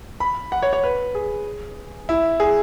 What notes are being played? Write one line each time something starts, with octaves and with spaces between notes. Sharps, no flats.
B5
F#5
C#5
C#5
B4
G#4
E4
G#4